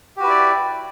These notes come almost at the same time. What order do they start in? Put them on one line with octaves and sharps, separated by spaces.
G4 F#4 B4 E4 D5